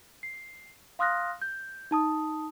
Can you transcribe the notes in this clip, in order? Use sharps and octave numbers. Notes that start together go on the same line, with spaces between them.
C7
F5 C6 D#6 F6 F#6 A#6
G6
D#4 A5 D#6